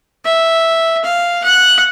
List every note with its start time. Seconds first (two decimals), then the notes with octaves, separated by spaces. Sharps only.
0.25 E5
1.04 F5
1.44 F#5